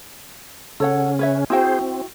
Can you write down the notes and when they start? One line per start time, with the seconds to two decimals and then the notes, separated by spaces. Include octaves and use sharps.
0.80 C#3 C#4 A4 C#5 F#5
1.19 B4 C#5 E5
1.50 C4 E4 F#4 G#4 C5 G5
1.81 C4